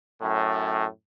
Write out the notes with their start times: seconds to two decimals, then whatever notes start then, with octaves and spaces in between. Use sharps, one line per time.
0.21 F#2 A2